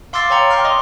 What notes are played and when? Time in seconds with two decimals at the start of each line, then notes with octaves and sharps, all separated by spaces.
0.13 F5 C6 D6 E6 A6 C7
0.30 C#5 G5 A#5 C#7
0.51 G5 C6 D6 F6
0.64 D#5 C6 D#6